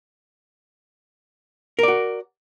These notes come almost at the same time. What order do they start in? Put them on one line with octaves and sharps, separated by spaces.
A#4 D5 F#4